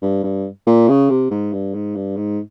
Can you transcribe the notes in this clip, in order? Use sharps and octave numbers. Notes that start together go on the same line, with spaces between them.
G2
G2
A#2
C#3
C3
G#2
G2
G#2
G2
G#2